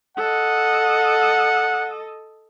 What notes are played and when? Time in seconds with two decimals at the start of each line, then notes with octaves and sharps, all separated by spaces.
0.17 A4 D#5 F#5